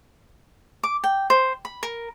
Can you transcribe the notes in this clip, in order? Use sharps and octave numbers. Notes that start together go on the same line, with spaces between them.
D6
G5
C5
B5
A#4